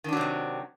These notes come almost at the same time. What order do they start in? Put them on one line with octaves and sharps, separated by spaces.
D#3 D4 F#3 C3 C4